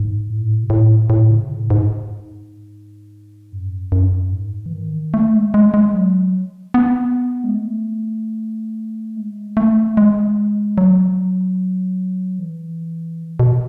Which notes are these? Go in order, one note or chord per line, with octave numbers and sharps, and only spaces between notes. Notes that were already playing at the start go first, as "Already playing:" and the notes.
Already playing: G#2
A2
B2
A2
A2
C#3
A2
G#2
F#2
F#2
G#2
E3
D#3
A3
G#3
G#3
G#3
F#3
B3
G#3
A3
G#3
A3
G#3
F#3
E3
B2